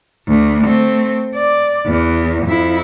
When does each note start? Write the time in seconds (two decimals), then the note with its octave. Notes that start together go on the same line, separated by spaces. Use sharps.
0.28 D2
0.63 A3 C4
1.35 D5
1.86 E2
2.45 F2 E4